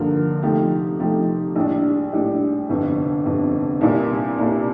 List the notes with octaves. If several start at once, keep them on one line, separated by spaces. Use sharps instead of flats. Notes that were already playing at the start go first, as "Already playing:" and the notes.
Already playing: G2 D3 F3 A#3
C3 F3 A3 D#4 G4
C3 F3 A3 D#4 G4
A#1 A2 G3 D4
A#1 A2 G3 D4
G1 F2 C3
G1 F2 C3
C2 A#2 G3
C2 A#2 G3